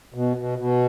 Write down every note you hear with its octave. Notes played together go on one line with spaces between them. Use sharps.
B2
B2
B2